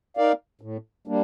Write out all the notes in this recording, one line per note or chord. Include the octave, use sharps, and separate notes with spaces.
D#4 A#4 D5 F5
A2
G3 A#3 D4